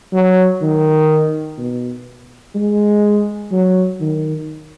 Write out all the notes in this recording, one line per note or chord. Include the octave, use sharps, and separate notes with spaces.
F#3
D#3
B2
G#3
F#3
D#3